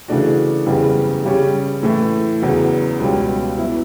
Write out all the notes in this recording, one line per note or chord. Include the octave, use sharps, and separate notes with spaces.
C#3 E3 A3 D4 F#4
F#1 E2 C#3 G3
C#3 G3 C#4 G4
A2 E3 A3
E2 C#3 F#3
C#2 B2 G3 C#4
F#3 B3 E4